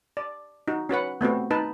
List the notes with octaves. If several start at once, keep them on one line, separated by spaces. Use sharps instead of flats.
D5
D#4 F#4
C#4 F#4 B4 F#5
A3 B3 C4 F#4
D#4 B4 A5